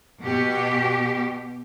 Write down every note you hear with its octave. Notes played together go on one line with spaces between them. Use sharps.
B2 G4